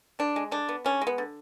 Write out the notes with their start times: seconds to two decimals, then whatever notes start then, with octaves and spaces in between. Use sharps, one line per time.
0.19 D3 D4
0.36 G#3
0.51 D3 D4
0.69 B3
0.85 D3 C#4
1.01 G#3
1.07 B3
1.18 D3